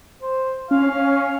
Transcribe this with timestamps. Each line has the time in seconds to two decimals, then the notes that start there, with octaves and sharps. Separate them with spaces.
0.22 C5
0.71 C#4 F5